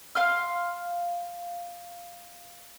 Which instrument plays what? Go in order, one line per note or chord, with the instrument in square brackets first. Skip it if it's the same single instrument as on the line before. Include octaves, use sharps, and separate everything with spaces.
[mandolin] F5 C6 F6